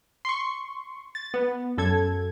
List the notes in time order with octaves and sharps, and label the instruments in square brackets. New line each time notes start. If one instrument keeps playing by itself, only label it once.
[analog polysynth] C6 C#6
A6
B3
F#2 A4 G#6